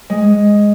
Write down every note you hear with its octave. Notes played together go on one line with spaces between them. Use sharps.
G#3